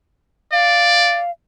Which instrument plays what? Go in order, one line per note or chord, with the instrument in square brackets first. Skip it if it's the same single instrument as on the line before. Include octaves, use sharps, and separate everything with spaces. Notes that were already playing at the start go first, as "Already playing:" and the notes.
[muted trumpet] D5 [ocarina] F5